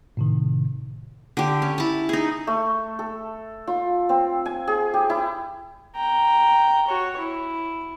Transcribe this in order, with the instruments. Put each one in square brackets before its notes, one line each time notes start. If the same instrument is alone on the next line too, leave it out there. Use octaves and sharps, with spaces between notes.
[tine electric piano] A2 C3 D#3
[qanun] D3 G4
C#4
E4 A5
D#4 G#4
[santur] A3
A4
F4
C4
G#5
G#4
G4
E4
[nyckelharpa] G5 A#5
F#4 C#5
E4